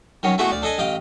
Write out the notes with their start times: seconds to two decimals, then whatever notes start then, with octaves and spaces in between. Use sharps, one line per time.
0.23 D#3 F#3 C#4
0.38 G#3 A3 B3 E4 F#4 G#4
0.51 D2 D5
0.62 D4 A4 D#5 G#5
0.78 A1 D#5 F5 G5